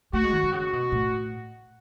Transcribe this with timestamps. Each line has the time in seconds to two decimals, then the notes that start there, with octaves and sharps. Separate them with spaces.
0.13 A3 F#4
0.24 G#3
0.33 D#3
0.43 D#3
0.52 C#3 F#4
0.73 B2
0.92 A2